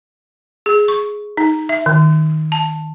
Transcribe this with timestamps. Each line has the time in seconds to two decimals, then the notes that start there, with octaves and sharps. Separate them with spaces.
0.66 G#4
0.88 C#6
1.37 D#4
1.69 E5
1.86 D#3
2.52 A5